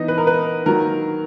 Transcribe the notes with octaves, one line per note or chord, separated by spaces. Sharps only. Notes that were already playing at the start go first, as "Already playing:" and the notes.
Already playing: E3 B3 D#4 D#5
B4
A#4
B4
D#3 F#3 A#3 A#4